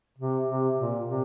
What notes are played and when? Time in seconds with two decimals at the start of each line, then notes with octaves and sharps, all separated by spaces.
0.18 C3
0.48 C3
0.78 A#2
1.07 C3